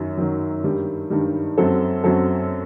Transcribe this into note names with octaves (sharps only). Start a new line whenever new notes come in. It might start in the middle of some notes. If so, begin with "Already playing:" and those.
Already playing: F#2 D#3 F#3
F#2 D#3 F#3
G2 D#3 G3
G2 D#3 G3
F#2 F#3 C4 F#4 A4
F#2 F#3 C4 F#4 A4